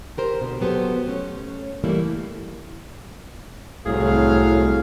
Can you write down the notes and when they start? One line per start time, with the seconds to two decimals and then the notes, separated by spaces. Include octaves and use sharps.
0.18 G4 A#4 C5
0.41 B2 D3
0.61 F#3 B3 G4 A4 C5
1.07 A3 C#4
1.84 E3 G3 A3 A#3 E4
3.86 C2 A2 F#3 G#4 F5